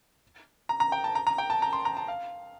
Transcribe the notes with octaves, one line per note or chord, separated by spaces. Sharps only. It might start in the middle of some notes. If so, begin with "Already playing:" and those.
A#5
A#5
G5
A5
A#5
A#5
G5
A5
A#5
C6
A#5
A5
F5